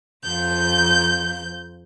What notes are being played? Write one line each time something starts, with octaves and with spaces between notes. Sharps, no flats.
F2 G6